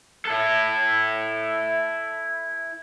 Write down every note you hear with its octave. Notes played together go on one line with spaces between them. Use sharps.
E4 A4